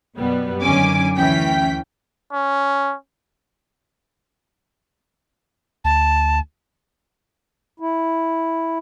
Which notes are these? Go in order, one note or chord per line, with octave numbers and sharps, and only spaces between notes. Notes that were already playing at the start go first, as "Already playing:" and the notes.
F#2 B2 G3 B3
F#2 D3 D#3 C#4 G#5 D6
D2 E3 C#4 G5 B6
C#4
D2 A5
E4